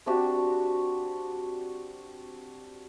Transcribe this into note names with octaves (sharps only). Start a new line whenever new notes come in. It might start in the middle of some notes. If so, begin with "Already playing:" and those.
C4 D4 F#4 G4